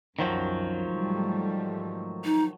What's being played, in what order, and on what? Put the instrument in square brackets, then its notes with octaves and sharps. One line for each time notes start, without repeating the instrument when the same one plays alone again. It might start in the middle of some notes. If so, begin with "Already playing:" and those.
[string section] C2 F#2 [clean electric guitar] D#3 F3 F#3
[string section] G#2 G3 A3
[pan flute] D#4